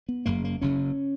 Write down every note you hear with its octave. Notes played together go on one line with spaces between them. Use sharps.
B3
F#1 F#2 C#3 A#3
A#3
F#1 F#2 C#3 C#4